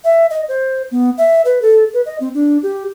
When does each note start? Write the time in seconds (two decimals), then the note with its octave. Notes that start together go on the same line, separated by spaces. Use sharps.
0.04 E5
0.30 D#5
0.49 C5
0.91 B3
1.18 E5
1.45 B4
1.62 A4
1.94 B4
2.06 D#5
2.20 C4
2.34 D4
2.63 G4